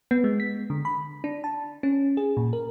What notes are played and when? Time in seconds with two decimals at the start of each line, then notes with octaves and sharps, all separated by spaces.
0.11 B3
0.24 G#3
0.40 B6
0.70 D3
0.85 B5
1.24 D4
1.44 A5
1.83 C#4
2.17 G#4
2.37 A#2
2.53 A#4